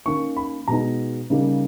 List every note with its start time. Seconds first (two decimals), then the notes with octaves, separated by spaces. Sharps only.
0.06 D#3 A#3 C#4 C#6
0.37 B5
0.68 B2 G#3 B3 D#4 A#5
1.30 C#3 G3 A#3 D#4